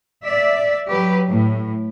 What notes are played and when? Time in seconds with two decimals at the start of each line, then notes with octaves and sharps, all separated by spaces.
0.24 D5 E5
0.89 F#3 G4 B4
1.27 A2